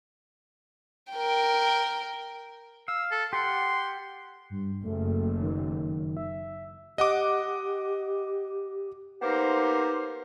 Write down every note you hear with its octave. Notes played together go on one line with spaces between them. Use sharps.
A#4 G5
F5 E6
A4
G4 F#5 C6
G2
F#1 A3
D#3
E5
G4 D#5 F#5 D6
A#3 B3 D#4 G4 A#4 C5